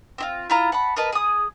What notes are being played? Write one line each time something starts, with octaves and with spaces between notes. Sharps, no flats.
C4 E4 F4
E4 F4 A#5
F#5 A5 B5
A#4 B4 D#5 A5
G#4 D#6